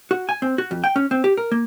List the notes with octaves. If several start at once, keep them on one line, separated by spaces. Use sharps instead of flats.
F#4
G#5
C4
F#4
F2
G5
C#4
C4
G4
A#4
A#3